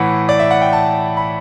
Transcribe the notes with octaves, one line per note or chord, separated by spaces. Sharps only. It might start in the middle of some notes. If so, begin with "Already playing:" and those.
Already playing: A2 E3 F#5
D5
E5
F#5
G5
A5
B5